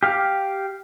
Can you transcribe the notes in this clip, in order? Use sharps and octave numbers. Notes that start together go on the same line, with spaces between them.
G4 F5